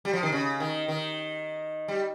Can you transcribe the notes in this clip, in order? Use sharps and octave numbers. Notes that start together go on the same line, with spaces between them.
G3
F3
D#3
C#3
D#3
D#3
G3